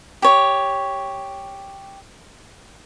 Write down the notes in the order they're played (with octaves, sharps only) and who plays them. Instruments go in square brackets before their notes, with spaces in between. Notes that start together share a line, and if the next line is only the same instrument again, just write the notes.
[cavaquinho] G4 C#5